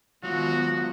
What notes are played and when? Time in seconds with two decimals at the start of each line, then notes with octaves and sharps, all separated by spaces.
0.23 D#3 F#3 G#3 B3 F4 F#4